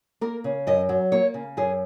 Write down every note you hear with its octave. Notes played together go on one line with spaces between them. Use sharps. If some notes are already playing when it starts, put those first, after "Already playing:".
A#3 A#4
C#3
F#2 D#5
F#3
A#3 C#5
C#3
F#2 G#4